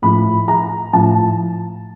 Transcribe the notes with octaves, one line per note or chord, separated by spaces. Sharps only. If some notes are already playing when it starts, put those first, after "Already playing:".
A2 F3 B5
A#5
A2 F3 A5